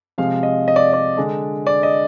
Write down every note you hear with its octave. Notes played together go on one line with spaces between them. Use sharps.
C3 F3 G#3 F5
D#5
D#5
D5
D5
D3 G#3 D4
D5
D#5